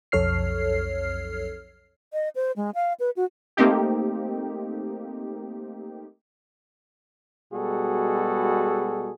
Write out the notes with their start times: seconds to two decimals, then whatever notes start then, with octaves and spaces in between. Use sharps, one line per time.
0.12 B1 F2 A4 C#5 F6 C7
2.12 D#5
2.36 C5
2.56 G#3
2.75 F5
3.00 B4
3.17 F#4
3.57 A3 A#3 C4 D#4 G4
7.52 B2 G3 G#3 F#4 G#4 A4